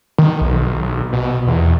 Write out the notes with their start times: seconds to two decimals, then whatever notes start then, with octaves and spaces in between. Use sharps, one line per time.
0.18 D#3
0.41 B1
1.13 B2
1.47 E2